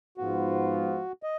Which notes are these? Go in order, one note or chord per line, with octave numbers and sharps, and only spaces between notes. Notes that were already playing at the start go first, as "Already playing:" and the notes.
G#2 F3 B3 F4 F#4
D#5